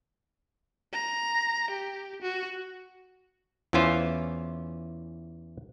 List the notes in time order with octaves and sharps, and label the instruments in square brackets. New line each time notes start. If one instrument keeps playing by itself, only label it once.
[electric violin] A#5
G4
F#4
[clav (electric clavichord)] E2 E3 C#4 F4 C5